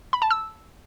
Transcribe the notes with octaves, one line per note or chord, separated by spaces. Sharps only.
B5
A5
E6